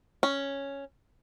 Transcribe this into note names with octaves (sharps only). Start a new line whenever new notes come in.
C#4